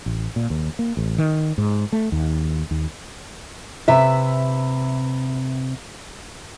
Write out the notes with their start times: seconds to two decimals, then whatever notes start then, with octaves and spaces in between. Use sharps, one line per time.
0.06 A1
0.36 A#2
0.50 D#2
0.79 A#3
0.97 A1
1.18 D#3
1.58 G#2
1.92 A3
2.12 D#2
2.71 D#2
3.88 C3 B4 E5